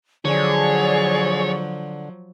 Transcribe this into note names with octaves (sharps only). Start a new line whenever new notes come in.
D3 F3 F#3 G#4 C#5 D5